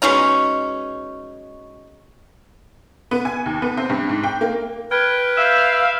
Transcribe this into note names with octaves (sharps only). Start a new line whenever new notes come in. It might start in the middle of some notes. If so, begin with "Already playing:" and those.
B2 G#3 C#4 D#4
B3
G#5
D#2
B3
C4
G2
G#2
G5
A#3
B4 G5 F6 G#6 D7
E5 F5 E6 G6